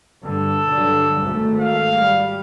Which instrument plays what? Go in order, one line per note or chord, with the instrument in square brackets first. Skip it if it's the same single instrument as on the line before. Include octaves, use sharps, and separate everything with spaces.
[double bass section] G2 D3 [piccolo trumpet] A4
[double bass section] G2 D3 F#3
G#1 G#2 A3
[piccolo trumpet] F5
[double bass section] G3